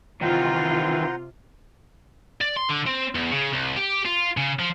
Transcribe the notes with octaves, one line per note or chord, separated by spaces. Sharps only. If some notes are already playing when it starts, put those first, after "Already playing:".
C3 D#3 E3 F4 C5 F#5 A#5
D5
C6
D3
C4
E2
C#3
C2
G4
F4
C#3
F3